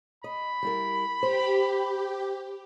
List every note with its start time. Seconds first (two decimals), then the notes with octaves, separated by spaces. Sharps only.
0.24 D#5 B5
0.63 G3 E4 A#4
1.23 G4 C5